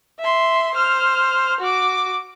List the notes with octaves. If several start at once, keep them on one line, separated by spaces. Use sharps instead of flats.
E5 C6
C5 F6
F#4 D6